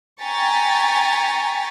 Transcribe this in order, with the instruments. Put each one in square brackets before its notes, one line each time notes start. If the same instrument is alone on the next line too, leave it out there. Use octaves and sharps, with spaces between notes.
[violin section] G5 G#5 A#5 C#6 A6 B6